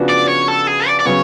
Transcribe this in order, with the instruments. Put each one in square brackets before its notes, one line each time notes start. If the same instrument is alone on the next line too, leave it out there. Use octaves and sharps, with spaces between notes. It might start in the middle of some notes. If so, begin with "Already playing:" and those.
Already playing: [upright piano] C#3 F3 B3 D4 F#4
[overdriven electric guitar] D5
C#5
A4
G#4
D5
D5
[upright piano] C#3 F#3 B3 [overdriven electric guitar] C#5